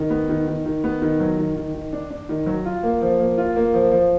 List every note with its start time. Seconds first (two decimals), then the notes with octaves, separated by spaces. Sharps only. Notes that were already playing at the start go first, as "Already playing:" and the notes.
Already playing: D#3
0.10 B3
0.29 D#3
0.47 D#3
0.66 D#3
0.84 B3
1.02 D#3
1.20 F#3
1.38 D#3
1.56 D#3
1.75 D#3
1.93 D4
2.10 D4
2.29 D#3
2.46 F#3
2.65 F4
2.83 A#3
3.02 F3
3.19 A#3
3.38 F4
3.56 A#3
3.74 F3
3.92 F3